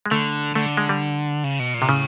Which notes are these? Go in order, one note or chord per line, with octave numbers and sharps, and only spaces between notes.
G#3
D3 A3
D3 A3
G#3
G3
C#3
B2
A#2
C3
A2 C#3